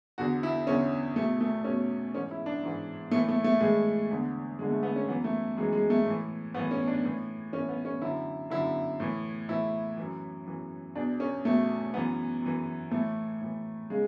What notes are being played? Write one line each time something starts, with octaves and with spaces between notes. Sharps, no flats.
E2 D3 F#4
E4
E2 D3 C#4
E2 B2 A3
A3
E2 B2 C#4
G#2 E3 C#4
E4
D4
G#2 E3
A2 E3 A3
A3
A3
A2 E3 G#3
E2 D3
E2 D3 G#3
A3
B3
C#4
F#2 E3 B3
A3
F#2 E3 G#3
G#3
A3
A2 E3
A2 E3 B3
C#4
D4
A2 E3
A2 E3 C#4
B3
C#4
F#2 D3 E4
F#2 D3 E4
A2 E3
A2 E3 E4
F#2 E3
F#2 E3
E2 B2 D4
C#4
E2 B2 A3
F#2 E3 B3
F#2 E3
A2 E3 A3
A2 E3
C#3 G#3